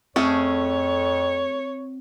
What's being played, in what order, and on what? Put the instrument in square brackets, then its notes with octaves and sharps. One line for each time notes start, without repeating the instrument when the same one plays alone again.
[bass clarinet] F2 [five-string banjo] A3 C#4 G#4 [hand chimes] C4 [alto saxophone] C#5